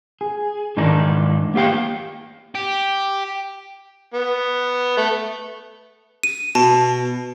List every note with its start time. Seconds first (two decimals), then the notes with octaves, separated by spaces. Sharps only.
0.21 G#4
0.77 G#2 D#3 E3 D4 D#4
1.54 A#3 B3 G4 F5 G5
2.55 G4
4.14 B3
4.97 A3
6.23 D#7
6.55 B2 A5